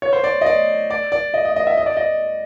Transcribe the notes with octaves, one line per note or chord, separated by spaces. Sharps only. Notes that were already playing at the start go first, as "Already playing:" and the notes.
C#5
C5
D5
D#5
D5
D5
D5
D#5
D#5
D#5
E5
D#5
D5
D#5